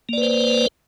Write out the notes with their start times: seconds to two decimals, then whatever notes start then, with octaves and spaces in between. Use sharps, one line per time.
0.09 A#3
0.13 D5
0.17 B4
0.22 C5